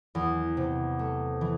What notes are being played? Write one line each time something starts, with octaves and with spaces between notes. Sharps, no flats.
E2
C3
A3
E3